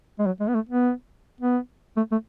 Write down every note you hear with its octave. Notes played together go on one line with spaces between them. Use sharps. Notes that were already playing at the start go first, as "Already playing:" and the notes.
G#3
F#3
G#3
B3
A3
B3
B3
A3
A3